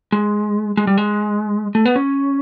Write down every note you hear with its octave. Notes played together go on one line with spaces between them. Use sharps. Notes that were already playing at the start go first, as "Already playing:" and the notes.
G#3
G#3
G3
G#3
A3
B3
C#4